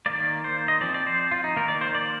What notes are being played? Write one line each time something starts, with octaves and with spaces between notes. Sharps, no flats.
D#3 A#3 D5
C5
D#5
F3 C4 D5
D5
C5
F4
D#4
D#3 A#3 A#4
D5
C5
D5